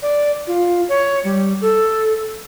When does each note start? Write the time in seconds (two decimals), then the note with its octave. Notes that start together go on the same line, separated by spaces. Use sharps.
0.02 D5
0.47 F4
0.89 C#5
1.24 G3
1.61 A4